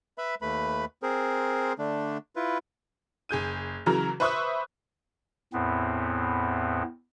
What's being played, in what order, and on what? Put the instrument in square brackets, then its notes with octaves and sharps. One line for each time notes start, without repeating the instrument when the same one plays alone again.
[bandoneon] B4 E5 B5
D#2 A3 B4 B5
C4 G#4 A#4 C5
D3 A3 D4
E4 F4 B4
[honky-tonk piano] F#1 G#4 G6 D#7
C#3 E3 F#3 A#4 A#5
B4 C5 E5 C#6 D#6 F#6
[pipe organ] E2 A2 B3 C4